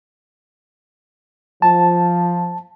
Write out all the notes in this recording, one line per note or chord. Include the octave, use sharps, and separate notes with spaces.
F3 A5